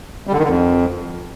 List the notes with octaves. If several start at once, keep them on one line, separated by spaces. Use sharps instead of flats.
G3
D3
D#3
D3
F2